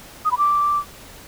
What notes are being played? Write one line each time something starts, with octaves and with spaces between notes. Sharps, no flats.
D#6
B5
D6